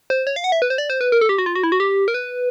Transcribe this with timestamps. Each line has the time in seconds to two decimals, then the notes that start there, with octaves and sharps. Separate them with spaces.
0.10 C5
0.27 C#5
0.36 F5
0.44 F#5
0.52 E5
0.62 B4
0.70 C5
0.78 D5
0.90 C5
1.01 B4
1.12 A#4
1.21 A4
1.29 G4
1.38 F#4
1.46 F4
1.55 F#4
1.63 E4
1.72 F#4
1.80 G4
2.08 A#4
2.14 B4